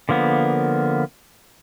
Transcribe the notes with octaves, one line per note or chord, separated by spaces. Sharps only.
D3 F3 A#3 B3